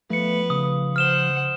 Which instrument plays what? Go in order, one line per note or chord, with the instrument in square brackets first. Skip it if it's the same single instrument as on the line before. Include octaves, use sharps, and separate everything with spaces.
[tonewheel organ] F3 [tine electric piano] A3 C#7 [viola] B3 B4
[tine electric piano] C#3 [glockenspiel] D#6
[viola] C5 F#5 [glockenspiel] F6 E7 G7